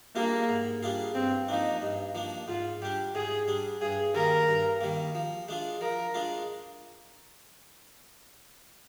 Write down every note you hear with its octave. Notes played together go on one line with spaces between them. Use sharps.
G3 A#3 D4 F4 G#4
G#2
G3 D4 F4 G#4
G2 C4
F3 A#3 D4 D#4
G2
F3 A#3 D4
G#2 F4
G3 D4 G4
G#2 G#4
G3 D4
G2 G#4
D#3 G3 A#3 A#4
G2
D#3 G3 A#3
F3
G#3 D4 F4
F3 A#4
G#3 D4 F4